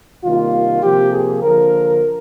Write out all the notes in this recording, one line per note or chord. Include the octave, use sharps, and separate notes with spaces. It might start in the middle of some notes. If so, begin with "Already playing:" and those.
C3 D#3 G3 A#3 F4
C3 F3 A#3 G4
G#4
D3 F3 A#3 A#4